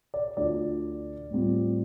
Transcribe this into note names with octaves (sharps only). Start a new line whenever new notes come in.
D5
D2 D3 A3 D4 F4 D5
A2 G3 C4 F4